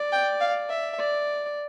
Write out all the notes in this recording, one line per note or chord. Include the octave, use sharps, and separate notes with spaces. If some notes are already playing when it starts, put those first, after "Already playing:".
Already playing: D5
G5
F5
E5
D5